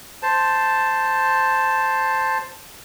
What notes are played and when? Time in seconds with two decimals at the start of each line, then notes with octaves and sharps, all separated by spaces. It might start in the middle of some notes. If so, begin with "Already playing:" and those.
0.23 C5 A5